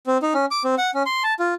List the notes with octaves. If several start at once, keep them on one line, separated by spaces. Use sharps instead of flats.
C4
D#4
C#4
D6
C4
F#5
C#4
C6
A5
F4